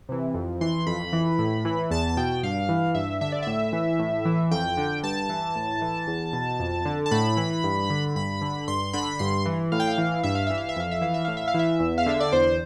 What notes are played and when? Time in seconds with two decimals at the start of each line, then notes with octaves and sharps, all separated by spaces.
0.09 C3 E3
0.34 F2
0.61 E3 C6
0.86 F2 B5
1.13 E3
1.39 A2
1.65 E3
1.91 E2 A5
2.09 A5
2.17 B2 G5
2.43 G2 F5
2.69 E3
2.95 G2 E5
3.21 D3 E5
3.32 D5
3.42 A2 E5
3.73 E3
3.99 A2
4.25 E3
4.51 F2 G5
4.77 D3
5.03 G2 A5
5.29 E3
5.55 A2
5.82 E3
6.07 E2
6.33 B2
6.60 F2
6.85 D3
7.06 A5
7.11 A2 B5
7.37 E3
7.63 G2
7.90 D3
8.15 G2 B5
8.41 D3
8.68 G2 C6
8.93 D3 B5
9.19 G2 C6
9.46 E3
9.72 A2 F5
9.80 G5
9.87 F5
9.98 E3
10.23 G2 E5
10.35 F5
10.47 E3 E5
10.58 F5
10.69 E5
10.76 F2 F5
10.91 E5
11.01 E3 F5
11.14 E5
11.25 A2 F5
11.37 E5
11.48 F5
11.54 E3 E5
11.80 E2
11.98 F5
12.06 D3 E5
12.20 D5
12.32 E2 C5